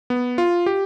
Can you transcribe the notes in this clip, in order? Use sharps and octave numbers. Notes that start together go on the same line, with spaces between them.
B3
F4
G4